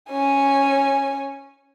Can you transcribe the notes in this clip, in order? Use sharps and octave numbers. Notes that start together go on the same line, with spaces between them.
C#4 G#5